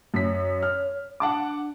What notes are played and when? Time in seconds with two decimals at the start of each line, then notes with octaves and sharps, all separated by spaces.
0.14 F#2 C#5 B6
0.63 F6
1.20 D4 F#5 A5 D6